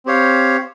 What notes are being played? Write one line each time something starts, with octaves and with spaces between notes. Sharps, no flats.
C4 G4 C#5 F5